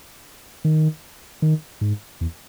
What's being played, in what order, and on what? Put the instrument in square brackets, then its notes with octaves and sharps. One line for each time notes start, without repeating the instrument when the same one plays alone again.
[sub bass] D#3
D#3
G#2
E2